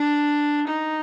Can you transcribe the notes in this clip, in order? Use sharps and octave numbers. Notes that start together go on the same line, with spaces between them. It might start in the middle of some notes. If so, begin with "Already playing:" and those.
Already playing: D4
D#4